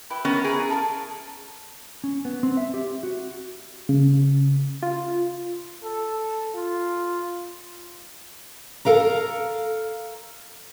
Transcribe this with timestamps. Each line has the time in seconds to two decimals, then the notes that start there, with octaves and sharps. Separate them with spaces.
0.10 E4 G4 B4
0.25 B3 C#4 A#4
0.44 E4 G#4 A#5
0.70 A4 A#4 F5
2.04 C#4
2.25 B3
2.43 C4
2.57 E5
2.74 G4
3.03 F#4
3.89 C#3
4.82 F4
5.82 A4
6.54 F4
8.85 A4 A#4 F5 A#5